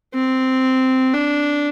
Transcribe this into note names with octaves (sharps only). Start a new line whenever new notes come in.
C4
D4